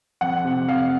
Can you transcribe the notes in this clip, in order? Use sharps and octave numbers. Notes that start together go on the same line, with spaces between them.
F2 F#5
C3
F2 F5